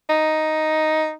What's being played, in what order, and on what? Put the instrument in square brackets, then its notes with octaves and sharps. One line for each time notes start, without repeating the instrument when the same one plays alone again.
[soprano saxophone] D#4